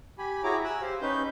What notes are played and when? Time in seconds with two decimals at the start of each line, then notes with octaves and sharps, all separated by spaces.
0.18 G4 G#5 B5
0.44 E4 F#4 G#4 C#5 A#5 D6
0.64 G#5 E6 F#6
0.81 G4 C5 F5
1.02 C#4 D#4 B4 G6